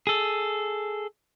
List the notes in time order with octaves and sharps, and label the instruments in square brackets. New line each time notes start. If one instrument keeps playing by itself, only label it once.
[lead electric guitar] G#4 A4